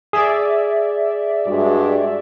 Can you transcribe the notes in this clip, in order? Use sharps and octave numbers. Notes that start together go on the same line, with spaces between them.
G#4 D5 E5
G2 G#3 F#4